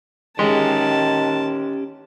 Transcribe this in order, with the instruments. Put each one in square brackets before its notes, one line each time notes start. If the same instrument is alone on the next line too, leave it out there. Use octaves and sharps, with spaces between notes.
[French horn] D#3 [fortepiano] G#3 [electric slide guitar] C#4 G4 [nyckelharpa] A5